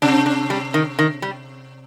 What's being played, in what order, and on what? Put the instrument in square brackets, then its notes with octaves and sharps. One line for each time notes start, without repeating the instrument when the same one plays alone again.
[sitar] C3 [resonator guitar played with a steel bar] D4
[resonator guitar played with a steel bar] D4
G3
D#3
D#3
G3